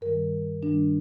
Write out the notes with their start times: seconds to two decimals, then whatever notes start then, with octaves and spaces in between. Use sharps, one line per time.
0.01 G2 D#3 G3 A#4
0.63 G2 D#3 G3 D4